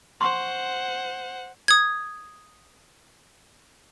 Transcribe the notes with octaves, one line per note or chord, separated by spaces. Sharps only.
C5 F#5 C6 C#6
D#6 G#6